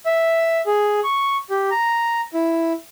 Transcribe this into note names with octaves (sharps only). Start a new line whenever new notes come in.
E5
G#4
C#6
G4
A#5
E4